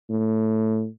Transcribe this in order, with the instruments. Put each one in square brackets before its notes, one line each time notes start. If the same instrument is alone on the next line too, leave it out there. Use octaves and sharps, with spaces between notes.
[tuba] A2